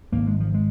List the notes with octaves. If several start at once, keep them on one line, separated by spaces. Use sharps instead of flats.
G#1 G#2 A#3
G#3
F3
G#3